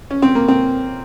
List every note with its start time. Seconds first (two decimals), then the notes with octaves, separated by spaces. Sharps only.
0.11 C#4
0.22 C4
0.35 A#3
0.48 C4